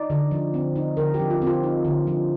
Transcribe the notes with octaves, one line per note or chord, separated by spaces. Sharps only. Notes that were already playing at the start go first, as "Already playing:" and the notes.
Already playing: D#4 D5
D3
F3
C4
D#4
D3 A#4
G4
F3
F4
C4 F4
D#4
D3
F3